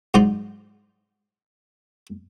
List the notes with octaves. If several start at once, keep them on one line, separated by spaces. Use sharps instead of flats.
G#2 F#3 D#4 C5 D5